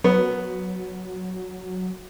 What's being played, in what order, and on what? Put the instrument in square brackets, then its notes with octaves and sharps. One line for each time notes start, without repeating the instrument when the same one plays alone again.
[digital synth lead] F#3 [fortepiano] B3